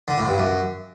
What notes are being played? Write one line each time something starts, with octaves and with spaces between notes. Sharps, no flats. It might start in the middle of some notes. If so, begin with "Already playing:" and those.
D3
A2
G2
F#2